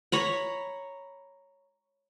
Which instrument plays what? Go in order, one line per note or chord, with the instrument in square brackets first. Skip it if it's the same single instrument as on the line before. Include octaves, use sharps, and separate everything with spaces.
[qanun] C#5 A#5 B5